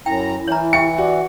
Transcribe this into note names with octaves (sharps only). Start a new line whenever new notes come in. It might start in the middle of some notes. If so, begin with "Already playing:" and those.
F#2 E4 G5 A#5
E3 C#5 A#5
G4 E5 G5 C#7
F#4 D5